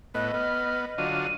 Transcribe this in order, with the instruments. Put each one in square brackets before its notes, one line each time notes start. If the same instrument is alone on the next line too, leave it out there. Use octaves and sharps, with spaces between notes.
[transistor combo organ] A2 B3 [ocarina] D#5 [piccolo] F#6
[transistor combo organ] B3 [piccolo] F6
[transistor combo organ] D3 F#3 F4 [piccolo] D#7